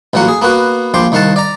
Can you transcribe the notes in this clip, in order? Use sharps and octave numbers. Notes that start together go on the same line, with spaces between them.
A1 A#2 F#3 A#3 F#5
G#4
A#3 B3 F#4 B4
A#1 F3 G5 C6 D6
C2 D#3 F5 F#5 A5
D5 A#5